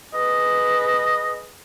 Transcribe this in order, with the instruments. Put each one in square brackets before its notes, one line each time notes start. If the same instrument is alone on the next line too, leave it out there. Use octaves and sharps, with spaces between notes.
[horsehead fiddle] G#4 B4 [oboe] D#5